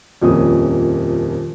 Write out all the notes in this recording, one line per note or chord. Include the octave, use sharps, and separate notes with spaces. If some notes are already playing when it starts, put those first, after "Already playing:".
D#1 F2 F3 A#3 C#4 D#6